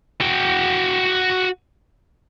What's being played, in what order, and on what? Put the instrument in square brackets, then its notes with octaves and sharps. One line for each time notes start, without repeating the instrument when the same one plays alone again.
[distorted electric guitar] F#4 G5